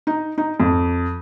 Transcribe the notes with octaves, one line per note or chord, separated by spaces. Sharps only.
D#4
D#4
F2